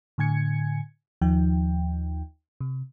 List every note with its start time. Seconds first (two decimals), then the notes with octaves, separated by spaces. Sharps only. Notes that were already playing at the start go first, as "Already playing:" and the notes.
0.18 A2 D3 G#5 G#6 C#7
1.21 D#2 F3 D#4 G5
2.61 C3